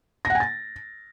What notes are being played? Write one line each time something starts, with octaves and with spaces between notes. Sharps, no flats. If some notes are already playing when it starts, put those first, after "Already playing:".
A#6
F#5
G#5
A6